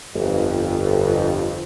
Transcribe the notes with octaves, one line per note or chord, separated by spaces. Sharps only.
G1 F2